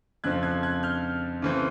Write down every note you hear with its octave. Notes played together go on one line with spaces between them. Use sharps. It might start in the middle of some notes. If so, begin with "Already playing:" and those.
F2 C#3 F3 A3 C4 F#6 G#6
F#6 G#6
F#6 G#6
F6 G6
C#3 E3 A3 C4